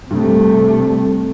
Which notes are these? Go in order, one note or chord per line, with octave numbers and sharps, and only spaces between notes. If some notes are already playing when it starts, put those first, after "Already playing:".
G2 C3 A3